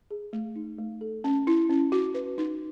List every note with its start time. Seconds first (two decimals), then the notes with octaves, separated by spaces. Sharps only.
0.11 G#4
0.33 A3
0.56 D#4
0.79 A3
1.01 A4
1.24 C#4
1.47 E4
1.69 C#4
1.92 F#4
2.14 B4
2.38 D#4